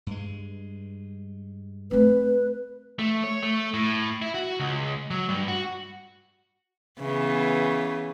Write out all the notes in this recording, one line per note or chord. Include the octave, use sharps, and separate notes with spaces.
G2 G#3
A3 C4 B4
A3
C#5
A3
A2
E4
F#4
C#2
F#3
G2
F#4
C#3 E3 B3